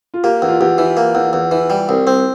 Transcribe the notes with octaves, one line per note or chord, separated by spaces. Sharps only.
F4
A#3 G4
E2
F4
E2 G4
E3
A#3
E2
E2
E3
G3
C2
C4